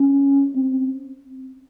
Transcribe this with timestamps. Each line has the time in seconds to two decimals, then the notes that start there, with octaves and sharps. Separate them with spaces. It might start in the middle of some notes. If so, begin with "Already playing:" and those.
Already playing: C#4
0.55 C4